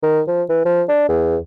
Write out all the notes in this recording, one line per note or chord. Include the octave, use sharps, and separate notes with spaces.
D#3
F3
E3
F3
D4
E2